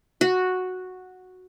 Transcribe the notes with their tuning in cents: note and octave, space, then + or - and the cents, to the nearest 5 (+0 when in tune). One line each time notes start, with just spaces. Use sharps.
F#4 -5